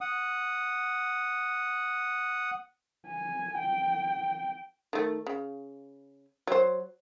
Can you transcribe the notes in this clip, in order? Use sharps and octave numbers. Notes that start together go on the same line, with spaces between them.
F#5 D#6
G#5
G5
D#3 A3
C#3
F#3 C5